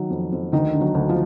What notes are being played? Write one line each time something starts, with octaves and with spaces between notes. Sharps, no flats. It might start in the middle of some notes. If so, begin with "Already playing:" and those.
Already playing: D#3 F#3
F2
F2
D2 D#3 D#4
D3
F#3 F#4
D2
F3 F4